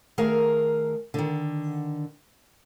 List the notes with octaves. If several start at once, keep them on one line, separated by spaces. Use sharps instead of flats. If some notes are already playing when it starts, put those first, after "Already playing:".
D#3 A3 G#4 A#4 F5
D3 D#3